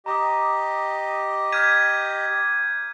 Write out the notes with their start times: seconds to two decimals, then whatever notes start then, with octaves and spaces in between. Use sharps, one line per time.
0.06 G4 D#5 A#5 D6 D#6
1.52 D6 F6 G6 G#6 B6 D#7